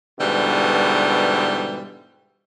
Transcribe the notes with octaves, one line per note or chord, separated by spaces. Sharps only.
G#2 B2 D3 E3 G3